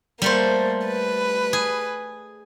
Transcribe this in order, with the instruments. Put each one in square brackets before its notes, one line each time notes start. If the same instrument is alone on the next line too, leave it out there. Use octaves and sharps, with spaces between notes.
[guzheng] G3 A3 C5 [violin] A#3
[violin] B4
[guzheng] G#4